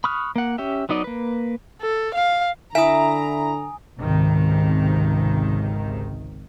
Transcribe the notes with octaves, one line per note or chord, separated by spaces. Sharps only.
B5 C#6 D#6 F6 F#6
A#3 F#5
C#4 G4 E5
F#3 B3 D#4 D5 D#5
A#3 B4
A4
F5
D3 E4 E5 G#5 A#5 D#6
G#1 C#2 G#2 C3 D#3